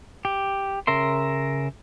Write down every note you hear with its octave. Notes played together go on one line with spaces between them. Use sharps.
G4
C#3 A#4 E5 C6